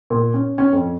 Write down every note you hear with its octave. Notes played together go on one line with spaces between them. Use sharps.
A#2
C#4
C#4
F2